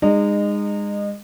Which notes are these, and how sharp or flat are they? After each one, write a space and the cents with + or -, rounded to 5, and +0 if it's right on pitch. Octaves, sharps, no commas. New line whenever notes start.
G#3 -25 D#4 -30